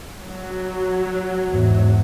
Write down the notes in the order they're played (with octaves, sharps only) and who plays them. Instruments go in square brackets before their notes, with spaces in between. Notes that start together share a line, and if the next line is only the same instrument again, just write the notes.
[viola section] F#3
[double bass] E2 G#2